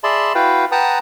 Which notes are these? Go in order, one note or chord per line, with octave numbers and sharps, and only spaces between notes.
G#4 D5 E5 A5 B5 C6
E4 F#4 B4 F5 G5
B4 F#5 G5 A5 A#5 D#6